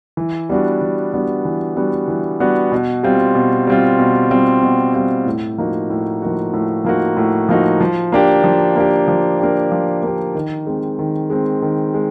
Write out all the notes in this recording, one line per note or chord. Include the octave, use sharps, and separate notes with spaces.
E3
G3 B3 D4 F#4
E3
G3 B3 D4 F#4
E3
G3 B3 D4 F#4
E3
G3 B3 D4 F#4
B2
G3 C4 F4
B2
G3 C4 F4
B2
G3 C4 F4
B2
G3 C4 F4
A2
F3 A#3 D#4 F#4
A2
F3 A#3 D#4 F#4
A2
F3 A#3 D#4 F#4
A2
F3 A#3 D#4 F#4
F3
A#3 D4 G4
F3
A#3 D4 G4
F3
A#3 D4 G4
F3
A#3 D4 G4
D#3
G#3 C4
D#3
G#3 C4
D#3
G#3